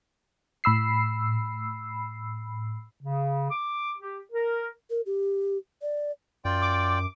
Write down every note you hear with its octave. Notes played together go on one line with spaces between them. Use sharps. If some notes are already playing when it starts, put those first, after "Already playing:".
A2 B5 E6 C7
C#3
D6
G4
A#4
A#4
G4
D5
F#2 F4 D5 G5
D6